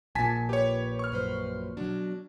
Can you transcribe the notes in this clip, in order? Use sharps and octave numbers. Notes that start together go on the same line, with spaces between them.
A#1 A#2 G#5 A5 B6
G4 B4 C#5
C#6 F6
F#2 B4 C5
B2 F#3 D4